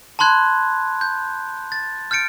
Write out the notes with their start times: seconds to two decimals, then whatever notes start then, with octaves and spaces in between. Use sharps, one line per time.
0.19 A5 B5 C6 F#6 G#6
1.01 G6
1.72 A6
2.11 F6 G6 A6 C#7 D7